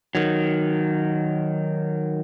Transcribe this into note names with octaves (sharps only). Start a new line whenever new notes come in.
D#3 F#3